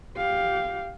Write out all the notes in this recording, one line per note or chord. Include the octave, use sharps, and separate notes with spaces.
G4 F5